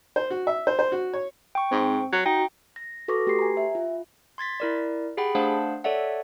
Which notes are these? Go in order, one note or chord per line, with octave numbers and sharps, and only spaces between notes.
C5
F#4
E5
C5
C5
F#4
C#5
G5 C#6
G#2 C4
F#3
D#4 F#4 G5
A#6
F#4 A4 B4 C#6 D6 A#6
A3 G4 B4 C6 C7
G#5 A#5
E5
F4
C6 G#6 A6 B6
E4 A#4 D5
G4 G#4 F#5 G5 B5
A3 D4 C5 F5 F#5 A5
A4 C#5 D5 E5 F#5